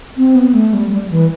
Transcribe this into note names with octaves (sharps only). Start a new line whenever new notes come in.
C4
B3
A3
G3
G3
E3